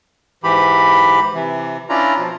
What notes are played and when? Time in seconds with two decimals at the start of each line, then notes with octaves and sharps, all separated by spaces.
0.44 G#2 E3 G4 B5
1.34 C3 E3
1.89 C#4 D4 E4 F4 D5 A#5
2.18 B2 F3